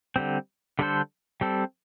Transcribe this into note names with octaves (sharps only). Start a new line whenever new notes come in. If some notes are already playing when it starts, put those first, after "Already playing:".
D3 G3 C4
D3 G3 D4 A4 C5
G3 C4 A4